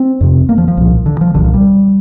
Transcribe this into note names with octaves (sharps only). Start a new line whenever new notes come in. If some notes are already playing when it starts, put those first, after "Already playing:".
Already playing: C4
F2 C3
A#3
F3
F3
C2 A#2
D3
F3
C2 A#2 D3
F3
G3